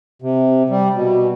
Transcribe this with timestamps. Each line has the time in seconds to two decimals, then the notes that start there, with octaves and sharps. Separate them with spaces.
0.22 C3
0.69 G3
0.94 B2